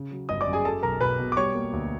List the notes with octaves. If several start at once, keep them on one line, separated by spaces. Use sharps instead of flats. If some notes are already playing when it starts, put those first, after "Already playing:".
Already playing: C#3
F#3
G1 D#5 D#6
D5 D6
F#2
G#4 G#5
F#3 A4 A5
B1 A#4 A#5
B1 B4 B5
B2
D6
G3 C#5 C#6
A#3
D2